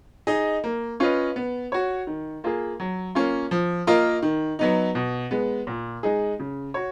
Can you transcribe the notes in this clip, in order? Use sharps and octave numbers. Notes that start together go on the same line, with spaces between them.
D#4 G#4 D#5
A#3
C#4 F4 B4 D#5
B3
F#4 C#5
D#3
A#3 F4 G#4
F#3
A#3 C#4 F4
F3
A#3 F4 A#4 D#5
D#3
F#3 B3 D#4
B2
G#3 B3
A#2
G#3 D#4 G#4
C#3
F#4 C#5